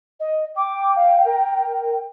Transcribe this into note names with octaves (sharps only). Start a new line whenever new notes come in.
D#5
G5 D6
F5
A#4